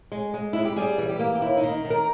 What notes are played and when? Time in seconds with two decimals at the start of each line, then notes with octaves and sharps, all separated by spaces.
0.12 G#3
0.34 G#3
0.53 G#3 E4
0.65 G4
0.76 G3 G#4
0.98 E3
1.09 G4
1.19 A#3
1.35 G4
1.41 D#2 E4
1.57 D#4
1.63 D#3
1.74 D#4
1.85 D#3
1.90 A#4